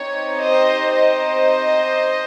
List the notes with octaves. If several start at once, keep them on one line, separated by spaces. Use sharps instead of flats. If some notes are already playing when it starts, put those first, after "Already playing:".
Already playing: C4 D#4 G4 C#5
C5 D#5
C5 D#5